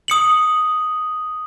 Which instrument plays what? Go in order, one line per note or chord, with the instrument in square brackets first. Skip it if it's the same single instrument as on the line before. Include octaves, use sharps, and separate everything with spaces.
[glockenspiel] D#6 C#7 F#7